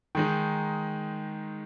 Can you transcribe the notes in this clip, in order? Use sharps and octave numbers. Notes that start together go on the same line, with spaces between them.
D#3 G#3 D#4